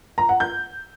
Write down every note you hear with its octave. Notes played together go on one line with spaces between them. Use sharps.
A#5
F#5
G6